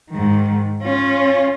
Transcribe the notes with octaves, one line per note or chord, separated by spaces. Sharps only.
G#2 D#3
C#4 F4